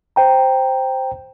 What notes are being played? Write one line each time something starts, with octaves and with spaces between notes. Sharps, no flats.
C5 G5 A#5